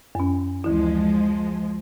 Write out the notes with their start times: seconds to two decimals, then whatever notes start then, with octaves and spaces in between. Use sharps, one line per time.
0.15 F#2 C#4
0.64 D2 E3 F3 G#3 E4